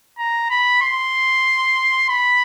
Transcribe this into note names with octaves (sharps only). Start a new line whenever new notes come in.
A#5
B5
C6
B5